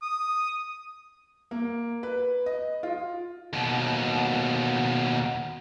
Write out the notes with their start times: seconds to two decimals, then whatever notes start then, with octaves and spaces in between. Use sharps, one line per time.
0.02 D#6
1.51 A#3
2.03 B4
2.46 D#5
2.83 F4
3.53 D#2 B2